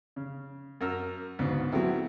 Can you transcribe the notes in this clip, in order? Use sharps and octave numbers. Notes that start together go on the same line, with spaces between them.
C#3
F#2 A#4 E6 F6
D2 G#2 C#3 B3
F#3 G#3 A3 B3 C4 E4